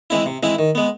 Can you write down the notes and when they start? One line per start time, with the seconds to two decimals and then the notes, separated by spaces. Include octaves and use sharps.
0.10 E3 G#3 C4 E4
0.26 C3
0.43 E3 G#3 C4 E4
0.59 D#3
0.75 G#3 B3